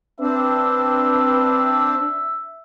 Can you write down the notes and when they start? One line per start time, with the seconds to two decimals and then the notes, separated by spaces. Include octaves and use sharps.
0.20 C4 D4 B4 E5